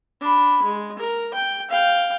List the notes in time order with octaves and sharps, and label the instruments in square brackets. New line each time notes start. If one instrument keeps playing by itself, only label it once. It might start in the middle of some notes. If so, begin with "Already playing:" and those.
[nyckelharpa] D4 B5
G#3
A#4
G5
F5 G5